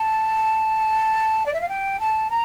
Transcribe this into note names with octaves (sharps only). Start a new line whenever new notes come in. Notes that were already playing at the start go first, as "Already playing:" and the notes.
Already playing: A5
D5
E5
F5
G5
A5
A#5